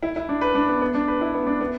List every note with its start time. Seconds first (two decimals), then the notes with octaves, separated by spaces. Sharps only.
0.03 E4
0.16 E4
0.29 D4
0.41 B4
0.55 D4
0.68 B3
0.81 B3
0.94 D4
1.08 B4
1.21 E4
1.34 B3
1.47 D4
1.61 B3